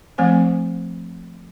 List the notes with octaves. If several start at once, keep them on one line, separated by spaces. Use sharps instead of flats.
F3 A3 C4 C5 G#5